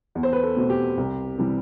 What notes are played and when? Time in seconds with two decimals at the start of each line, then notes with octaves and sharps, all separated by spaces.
0.15 E2
0.23 C5
0.33 B4
0.43 A4
0.56 B2 A3 C4
0.70 G4
0.97 C2
1.38 C3 E3 G3